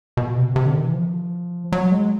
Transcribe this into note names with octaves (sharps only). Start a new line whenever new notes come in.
B2
C3
C3
D3
D#3
E3
F3
F#3
G#3